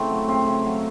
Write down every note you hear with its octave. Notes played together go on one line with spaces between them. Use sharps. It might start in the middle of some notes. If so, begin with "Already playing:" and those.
Already playing: C#3 A3 C4 E4
F#3
C#3 C4
C#3
F#3